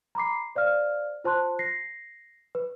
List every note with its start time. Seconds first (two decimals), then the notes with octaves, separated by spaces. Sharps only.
0.15 A#5 B5 D6 C7
0.55 C5 D5 F5 F6
1.24 F4 C5 A5 C6 F#6
1.59 A#6 C7
2.55 B4